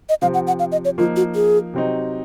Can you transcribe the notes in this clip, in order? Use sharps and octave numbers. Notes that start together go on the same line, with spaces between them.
D#5
C3 F3 C4 F5
F#5
F#5
F5
D#5
C#5
F3 A#3 D#4 F4
F#4
G#4
C3 F#3 C4 D#4